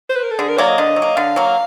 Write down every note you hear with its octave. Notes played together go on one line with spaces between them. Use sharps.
C5
B4
A#4
A4
D3 G#4
A#4
F#3 A#3 D5
D#5
D3 D#5
F#3
A#3
D3 F5
F#3 A#3